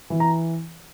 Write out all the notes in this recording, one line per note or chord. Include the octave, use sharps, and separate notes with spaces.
E3
A#5